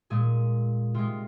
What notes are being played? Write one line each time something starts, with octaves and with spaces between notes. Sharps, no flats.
A#2 G#3 G#4
C3 G#3 F4